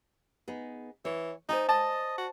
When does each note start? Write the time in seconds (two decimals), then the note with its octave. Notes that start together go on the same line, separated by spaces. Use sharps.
0.48 B3 D#4 G#4
1.05 E3 C#5
1.49 D#4 C5 D5 G#5
1.69 D#5 A5
2.18 F#4